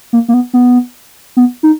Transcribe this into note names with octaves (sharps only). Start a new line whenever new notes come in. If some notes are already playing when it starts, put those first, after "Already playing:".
A#3
A#3
B3
B3
B3
D#4